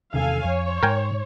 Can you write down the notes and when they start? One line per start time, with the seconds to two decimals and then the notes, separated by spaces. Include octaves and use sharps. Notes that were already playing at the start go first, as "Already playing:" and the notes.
0.14 E2 C3 D#3 A4 F5 G#5
0.44 F2 C#5
0.83 G#2 A#4 G5 G#5